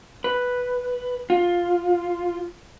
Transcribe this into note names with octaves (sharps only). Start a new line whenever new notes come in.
B4
F4